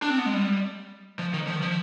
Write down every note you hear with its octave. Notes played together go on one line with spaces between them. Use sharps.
D4
C4
B3
G#3
G3
F3
D#3
F3
D#3
F3